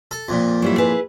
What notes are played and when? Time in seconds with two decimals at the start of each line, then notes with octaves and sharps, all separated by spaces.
0.11 A4
0.29 F2 A#2
0.62 F#3 G3 E4
0.78 E4 G#4 B4